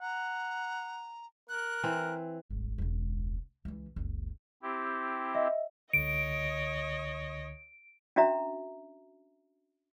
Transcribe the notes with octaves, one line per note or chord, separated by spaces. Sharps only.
F#5 A#5
A#4 F#6
E3 C4
D#1 G#1
E1 C#2
C#2 E3
F#1 C#2
C4 E4 G4
D#5 E5
C#2 D3 C#5 D#5 D7
C#4 D4 F#4 E5 A#5